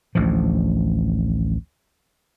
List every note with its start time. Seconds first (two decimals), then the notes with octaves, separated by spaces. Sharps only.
0.15 A1 D2 F3